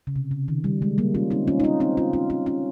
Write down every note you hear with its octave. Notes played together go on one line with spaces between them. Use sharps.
C#3
C3
C#3
D#3
G3
G#3
G3 A#3
C#4 F4
C4 D#4
C#4 F4
D#4
C#4 F4
C4 D#4
C#4 F4
C#4 F4
C#4 F4
C#4 F4